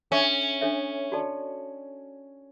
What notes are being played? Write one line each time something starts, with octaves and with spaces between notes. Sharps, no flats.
C#4 D4 A4 C#5 E5
D4 A4 C#5 E5
F#4 A4 D5 A5